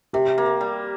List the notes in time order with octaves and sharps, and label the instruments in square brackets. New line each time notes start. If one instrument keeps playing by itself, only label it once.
[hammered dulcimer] C3 [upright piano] G4
[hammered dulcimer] A#3
G3